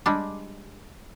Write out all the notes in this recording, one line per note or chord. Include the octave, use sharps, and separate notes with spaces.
G3 G#3 D4